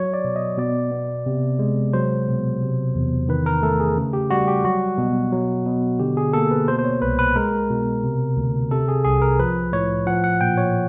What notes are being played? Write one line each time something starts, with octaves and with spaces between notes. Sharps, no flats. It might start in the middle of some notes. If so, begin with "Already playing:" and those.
Already playing: F#3 C#5
D5
B2
D#5
B2 D5
B3
C3
G#3
F#3 C5
B2
C3
E2
D#3 B4
A#4
A3 A4
G#4
C#3
G4
G3 F#4
G4
F#3 F#4
B2
F#3
B2
D3 G4
G#4
A#3 A4
B4
B2 C5
C5
C#5
C2 B4
B4
G#3 A#4
B2
C3
D2
C3 A4
G#4
C2 G#4
A#4
F3 B4
A2 C#5
F3 F#5
F#5
A#2 G5
C#5